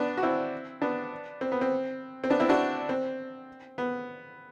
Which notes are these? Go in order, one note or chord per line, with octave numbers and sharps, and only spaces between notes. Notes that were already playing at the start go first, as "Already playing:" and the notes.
Already playing: B3 D4
F#4
C4 E4
B3 D4
C4
B3
C4
C4
B3 D4
C4 E4
D4 F#4
C4
B3